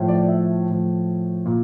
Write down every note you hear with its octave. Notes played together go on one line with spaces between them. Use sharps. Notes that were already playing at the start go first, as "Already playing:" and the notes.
Already playing: A2 F3
D5
E5
A2 F3
A#2